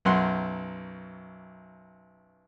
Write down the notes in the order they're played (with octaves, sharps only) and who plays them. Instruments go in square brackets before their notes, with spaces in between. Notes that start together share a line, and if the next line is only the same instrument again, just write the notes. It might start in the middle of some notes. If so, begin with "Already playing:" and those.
[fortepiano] B1 F#2 F#5 C6